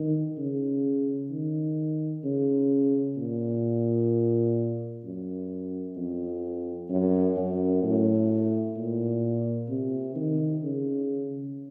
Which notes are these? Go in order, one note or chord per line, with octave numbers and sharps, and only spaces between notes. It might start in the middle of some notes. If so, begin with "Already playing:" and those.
Already playing: D#3
C#3
D#3
C#3
A#2
F#2
F2
F#2
F#2
A2
A#2
C3
D#3
C#3